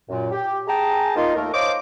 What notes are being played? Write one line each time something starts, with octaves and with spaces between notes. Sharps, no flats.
F#2 A#2
G4
G#4 G5 A5 A#5
A#3 D#4 F4
D#2 A3 A#4
C5 C#5 D#5 F5 D6